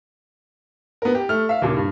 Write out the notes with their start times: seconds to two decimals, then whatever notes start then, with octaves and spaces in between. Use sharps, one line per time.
1.02 B3 A#4
1.15 G4
1.29 A3 F6
1.49 E5 F5
1.62 D#2 A#2 C#3
1.77 G2